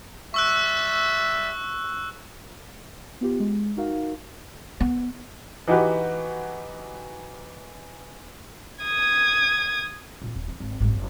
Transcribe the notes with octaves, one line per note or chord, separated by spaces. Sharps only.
G3 E5 C#6 E6 F#6
B3 F4 G4
G#3
D#4 F#4 A#4 F5
B3
E3 D#4 F#4 G4 B4
D#6 G#6
A#2 D#3
D#1
E3
G#1
G#1 G3
F#1